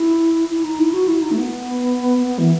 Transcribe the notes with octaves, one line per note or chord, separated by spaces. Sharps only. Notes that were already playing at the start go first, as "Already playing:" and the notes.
Already playing: E4
E4
D#4
E4
F#4
E4
D#4
A3
B3
B3
E3